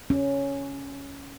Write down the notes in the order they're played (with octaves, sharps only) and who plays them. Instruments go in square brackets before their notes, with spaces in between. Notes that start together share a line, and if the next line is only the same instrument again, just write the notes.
[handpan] C#4